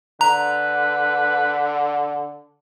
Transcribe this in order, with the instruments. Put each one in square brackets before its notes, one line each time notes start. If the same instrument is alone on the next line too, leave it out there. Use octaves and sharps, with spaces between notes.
[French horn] D3 [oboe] B4 [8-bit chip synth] A#5